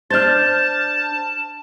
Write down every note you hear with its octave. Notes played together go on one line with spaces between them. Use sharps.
D4 C5 A5 F6 G6 A6